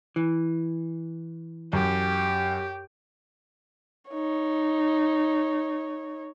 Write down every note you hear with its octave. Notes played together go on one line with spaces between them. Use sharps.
E3
F#2 G4
D#4 C#5